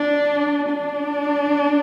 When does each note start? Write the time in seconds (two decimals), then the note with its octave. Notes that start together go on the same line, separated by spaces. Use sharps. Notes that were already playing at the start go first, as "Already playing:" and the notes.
Already playing: D4
0.70 D4